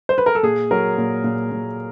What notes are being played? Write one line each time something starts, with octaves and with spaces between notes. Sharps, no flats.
C5
B4
A#4
A4
A#2 G#4
F#3 A#4
A#2
A#2
A#2